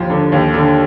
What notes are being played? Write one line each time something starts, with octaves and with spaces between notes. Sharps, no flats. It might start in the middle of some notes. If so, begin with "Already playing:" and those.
Already playing: D#2 F3
D3
D#2
D3